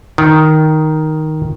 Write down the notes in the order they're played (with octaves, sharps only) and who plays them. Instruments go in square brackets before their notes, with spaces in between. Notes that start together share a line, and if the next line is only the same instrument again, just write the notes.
[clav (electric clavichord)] D#3